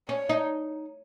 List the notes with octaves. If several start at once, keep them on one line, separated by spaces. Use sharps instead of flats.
C#4 C#5
D#4